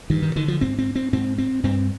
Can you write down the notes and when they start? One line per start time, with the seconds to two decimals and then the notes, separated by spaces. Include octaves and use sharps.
0.10 G2 D#3
0.22 D#3
0.36 D3 D#3
0.48 F3
0.61 G#2 C4
0.78 C4
0.96 C4
1.13 G#2 C4
1.38 C4
1.63 G2 C4